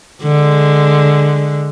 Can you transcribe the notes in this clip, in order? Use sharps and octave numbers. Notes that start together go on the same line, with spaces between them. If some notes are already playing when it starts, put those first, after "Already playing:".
D3 G#3